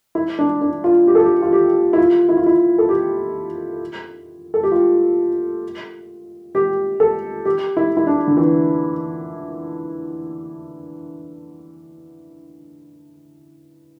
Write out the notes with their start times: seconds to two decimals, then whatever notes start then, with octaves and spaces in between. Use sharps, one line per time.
0.15 E4
0.39 D4
0.62 D4
0.84 F4
1.07 G4
1.15 A4
1.24 G4
1.42 F4
1.53 G4
1.93 E4
1.98 F4
2.29 E4
2.37 F4
2.46 E4
2.78 A4
2.89 G4
4.54 A4
4.63 G4
4.72 F4
6.55 G4
7.00 A4
7.45 G4
7.77 E4
7.97 E4
8.07 D4
8.27 D3
8.37 E3